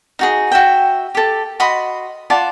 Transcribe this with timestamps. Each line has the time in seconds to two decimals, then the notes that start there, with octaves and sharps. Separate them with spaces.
0.19 D#4 F#4 G#4
0.52 F#4 E5 G5
1.15 G4 A4
1.60 F#4 D#5 B5 C6
2.30 F4 D5 F#5 A5